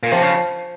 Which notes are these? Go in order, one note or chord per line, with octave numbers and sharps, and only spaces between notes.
A#2
C3 F3
C#3